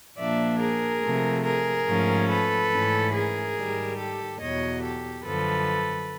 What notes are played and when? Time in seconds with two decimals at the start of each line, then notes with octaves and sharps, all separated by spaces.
0.17 A#2 F3 A#3 D4 D5 E5
0.60 G#4 A#4
1.01 C3 F3 A3
1.44 G#4 A#4
1.86 G#2 F3 A3 C#4
2.29 A4 B4
2.71 G#2 E3 A3 C#4
3.13 G#4 A#4
3.55 G#2 D#3 G3
3.97 G4 A4
4.39 E2 B2 F#3 C#5 D#5
4.82 G4 A4
5.24 F#2 D3 F3 A4 B4